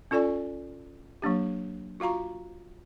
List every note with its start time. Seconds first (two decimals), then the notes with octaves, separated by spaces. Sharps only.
0.11 C#4 F4 A4 D5 G#5 C#6
1.22 F#3 A#3 D4 G4
2.00 F4 F#4 F5 A#5 C#6